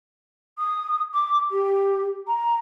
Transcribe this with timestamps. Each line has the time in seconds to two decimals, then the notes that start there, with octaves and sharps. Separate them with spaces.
0.58 D#6
1.14 D6
1.51 G4
2.28 A#5